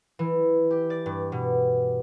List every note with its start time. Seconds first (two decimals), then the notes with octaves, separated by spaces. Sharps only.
0.19 E3
0.71 G4
0.90 D5
1.06 G2
1.32 B2